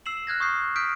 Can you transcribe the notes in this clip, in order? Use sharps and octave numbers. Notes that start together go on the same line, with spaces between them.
E6 C7 E7 F#7
F6 F#6 G#6 A#6
C#6 D#6 G6 C7
D#6 F6 G6 B6 D7